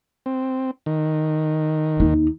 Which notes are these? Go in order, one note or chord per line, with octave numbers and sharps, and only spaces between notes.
C4
D#3
D#2 D#4